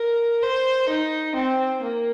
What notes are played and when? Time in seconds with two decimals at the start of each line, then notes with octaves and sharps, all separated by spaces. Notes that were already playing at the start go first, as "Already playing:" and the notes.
Already playing: A#4
0.42 C5
0.89 D#4
1.35 C4
1.83 A#3